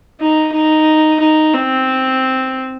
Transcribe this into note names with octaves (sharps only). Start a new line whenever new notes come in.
D#4
D#4
D#4
C4